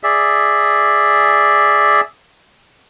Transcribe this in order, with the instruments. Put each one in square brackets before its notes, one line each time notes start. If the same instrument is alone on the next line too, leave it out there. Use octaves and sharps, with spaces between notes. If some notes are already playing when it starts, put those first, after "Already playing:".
[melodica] G#4 D5 E5